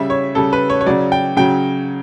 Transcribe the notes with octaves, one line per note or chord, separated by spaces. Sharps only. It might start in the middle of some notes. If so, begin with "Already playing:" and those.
Already playing: C#3 G3 E5
C#5
C#3 G3 A4
B4
C#5
C#5
C#3 F#3 D5
G5
C#3 F#3 G5